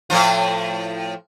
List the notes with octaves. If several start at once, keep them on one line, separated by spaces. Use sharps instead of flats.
A2 F3 F4